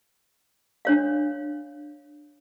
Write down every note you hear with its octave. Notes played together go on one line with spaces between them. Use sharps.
D4 C#5 F5